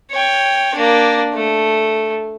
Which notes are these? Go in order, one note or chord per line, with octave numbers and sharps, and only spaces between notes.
C#5 G5
A#3 D4
A3